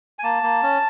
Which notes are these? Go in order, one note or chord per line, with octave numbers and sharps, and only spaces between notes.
G#5
A#3 A5
A#3
C#4